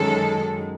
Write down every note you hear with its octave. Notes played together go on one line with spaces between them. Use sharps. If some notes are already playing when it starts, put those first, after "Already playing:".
Already playing: F#2 D#3 G#3 A4